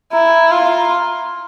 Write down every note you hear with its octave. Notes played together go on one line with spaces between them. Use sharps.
E4 A#5
F4